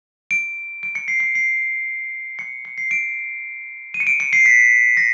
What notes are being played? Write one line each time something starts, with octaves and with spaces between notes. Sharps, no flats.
D7
D7
C#7
C7
C#7
C7
C#7
C#7
C7
D7
D#7
C#7
D7
C#7
C7
B6
A#6